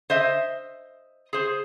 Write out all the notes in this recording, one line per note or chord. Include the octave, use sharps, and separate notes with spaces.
C5 D#5 E5
G#4 C5